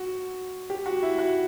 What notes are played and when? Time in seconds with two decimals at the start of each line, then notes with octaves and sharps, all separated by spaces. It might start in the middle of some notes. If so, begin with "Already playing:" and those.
Already playing: F#4
0.70 G4
0.86 F#4
1.03 E4
1.18 F#4